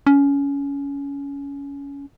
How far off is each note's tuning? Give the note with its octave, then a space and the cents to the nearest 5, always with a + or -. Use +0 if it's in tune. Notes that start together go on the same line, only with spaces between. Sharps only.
C#4 +20